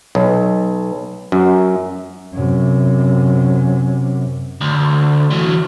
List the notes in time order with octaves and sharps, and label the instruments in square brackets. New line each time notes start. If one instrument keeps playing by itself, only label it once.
[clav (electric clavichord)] B1
F#2
[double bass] F#2 C3
[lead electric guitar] D2
E3 F#3